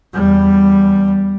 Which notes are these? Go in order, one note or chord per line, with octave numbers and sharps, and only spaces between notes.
E2 G3